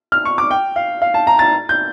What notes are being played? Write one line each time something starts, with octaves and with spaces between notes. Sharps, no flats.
F6
C#6
D6
G5
F5
F5
A5
A#5
A6
G6